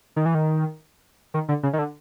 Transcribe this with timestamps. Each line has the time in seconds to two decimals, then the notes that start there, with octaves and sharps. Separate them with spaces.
0.16 D#3
0.26 E3
0.35 D#3
1.34 D#3
1.49 D3
1.63 C#3
1.73 D#3
1.79 D3